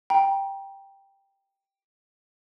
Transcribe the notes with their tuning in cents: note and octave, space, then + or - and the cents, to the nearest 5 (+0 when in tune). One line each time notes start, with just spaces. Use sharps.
G5 +5 A#5 +35